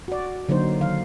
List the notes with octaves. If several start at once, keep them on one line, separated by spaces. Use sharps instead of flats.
F#4 D5
D3 F#3 A#3 D#4 C5
D#3 F5